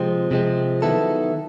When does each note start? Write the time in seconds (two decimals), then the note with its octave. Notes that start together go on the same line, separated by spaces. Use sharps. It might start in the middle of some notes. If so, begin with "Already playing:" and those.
Already playing: C3 F3 G#3 C4
0.31 C3 F3 G#3 C4
0.82 D#3 F#3 B3 E4 A4